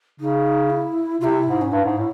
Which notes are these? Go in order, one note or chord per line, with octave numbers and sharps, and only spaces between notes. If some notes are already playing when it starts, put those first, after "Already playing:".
C#3 D#4
E4
C3 E4 F4
G#2
C#4
G2 D4
G#2
E4
A2